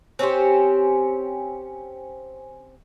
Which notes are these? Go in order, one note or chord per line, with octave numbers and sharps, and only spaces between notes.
C4 C#4 G4 C5